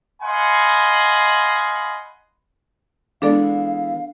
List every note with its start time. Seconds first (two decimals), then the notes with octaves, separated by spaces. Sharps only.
0.22 D#5 F5 F#5 G#5 B5 C6
3.22 E3 G#3 B3 D4 A4 D5 F5